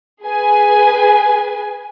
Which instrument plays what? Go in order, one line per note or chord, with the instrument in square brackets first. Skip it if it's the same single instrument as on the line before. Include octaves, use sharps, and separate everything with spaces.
[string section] G#4 B4 G#5